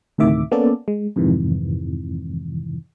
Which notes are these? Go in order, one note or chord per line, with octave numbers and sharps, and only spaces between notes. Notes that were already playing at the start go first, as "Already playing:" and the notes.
D2 A2 C3 D#3 E5 D6
A#3 B3 C#4 A4 D5
G#3
F2 G#2 C3 D#3 E3